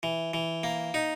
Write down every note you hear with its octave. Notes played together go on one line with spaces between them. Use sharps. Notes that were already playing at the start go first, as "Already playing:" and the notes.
E3
E3
A#3
D#4